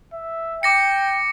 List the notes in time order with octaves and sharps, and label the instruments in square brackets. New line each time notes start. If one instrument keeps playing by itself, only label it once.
[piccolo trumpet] E5
[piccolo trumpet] G5 [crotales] D6 A#6 C#7